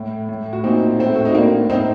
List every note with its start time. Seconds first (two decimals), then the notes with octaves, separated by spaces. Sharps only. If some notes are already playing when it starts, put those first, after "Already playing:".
Already playing: A2
0.29 A2
0.53 F#4
0.64 A#2 C4 D#4
0.99 A2 A3 C4
1.15 F#4
1.25 D#4
1.34 A2 A#3 D4
1.69 A2 C4 D#4